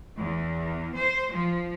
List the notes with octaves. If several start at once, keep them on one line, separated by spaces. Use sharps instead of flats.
E2
C5
F3